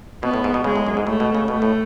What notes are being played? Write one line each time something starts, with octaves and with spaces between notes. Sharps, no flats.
B2 B3
A2
G#2
B2
C#3 G#3
A2
F#2
G#2
A2 A3
B2
C#3
B2 A3
A2